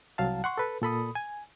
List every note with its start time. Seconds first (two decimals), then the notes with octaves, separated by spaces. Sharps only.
0.18 C2 F#3 F5 A5
0.44 F#5 C6 C#6
0.58 A4 B4
0.82 A#2 A4 B5 D#6
1.15 G#5